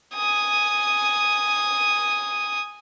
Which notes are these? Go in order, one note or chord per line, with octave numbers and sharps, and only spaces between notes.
G#5 D#6